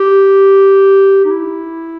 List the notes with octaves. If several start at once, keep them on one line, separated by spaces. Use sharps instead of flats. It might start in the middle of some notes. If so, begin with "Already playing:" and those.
Already playing: G4
D#4
E4